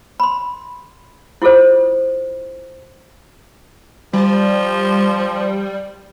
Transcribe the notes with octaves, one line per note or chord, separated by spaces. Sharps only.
B5 C6
E4 F4 G#4 A4 C5
F3 G3